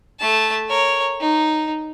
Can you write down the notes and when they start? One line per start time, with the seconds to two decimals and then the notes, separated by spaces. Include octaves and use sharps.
0.20 A3 A5
0.69 A#4 C#5
1.20 D#4